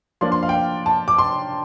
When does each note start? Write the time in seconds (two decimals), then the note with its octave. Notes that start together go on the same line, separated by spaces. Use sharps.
0.21 F3 A#3 D4 C6
0.32 C6
0.43 F5
0.49 G5
0.54 F5
0.86 A5
1.08 D6
1.18 C6